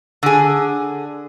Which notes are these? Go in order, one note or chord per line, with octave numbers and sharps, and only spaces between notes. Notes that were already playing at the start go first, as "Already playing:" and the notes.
D3 G#4